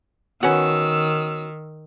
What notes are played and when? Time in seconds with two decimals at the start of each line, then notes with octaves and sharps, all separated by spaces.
0.43 D#3 B3 C#4 F#4 E6